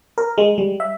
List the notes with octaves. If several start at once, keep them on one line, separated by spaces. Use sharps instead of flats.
A#4
G#3
G3
E5